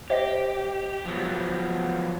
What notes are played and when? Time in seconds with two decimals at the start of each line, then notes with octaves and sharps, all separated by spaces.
0.10 G4 C5 D#5 A#6
1.05 F3 F#3 B3